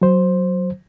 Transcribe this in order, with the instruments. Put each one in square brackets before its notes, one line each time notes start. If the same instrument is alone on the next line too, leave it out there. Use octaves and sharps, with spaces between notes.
[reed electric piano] F#3 C5